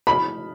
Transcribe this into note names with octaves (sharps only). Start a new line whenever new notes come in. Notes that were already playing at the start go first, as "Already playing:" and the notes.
B5